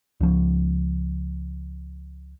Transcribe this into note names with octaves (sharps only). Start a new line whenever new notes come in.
C#2 F3